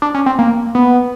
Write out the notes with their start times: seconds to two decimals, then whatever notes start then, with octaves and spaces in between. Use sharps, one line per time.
0.02 D4
0.14 C#4
0.26 C4
0.39 A#3
0.75 B3